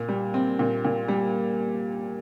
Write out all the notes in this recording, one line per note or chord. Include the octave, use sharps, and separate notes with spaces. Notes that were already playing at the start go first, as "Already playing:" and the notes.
Already playing: A#2
G3
C4
A#2
A#2
G3